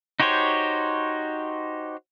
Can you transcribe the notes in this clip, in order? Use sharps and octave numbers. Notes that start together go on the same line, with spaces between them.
D#4 F#4 G4 C5 C#5